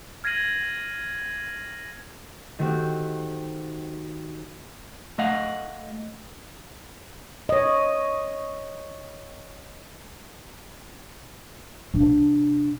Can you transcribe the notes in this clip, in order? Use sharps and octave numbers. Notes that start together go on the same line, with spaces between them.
F6 G#6 A#6 C7 D#7 F#7
D#3 A3 C4 F#4 G4
A3 D#5 F5 F#5
C#5 D#5
C3 D4